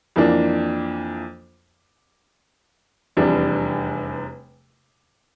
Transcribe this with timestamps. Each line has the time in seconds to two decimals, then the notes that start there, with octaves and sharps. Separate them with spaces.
0.16 F2 E3 A#3 D4
3.17 F1 E2 C3 G3 D4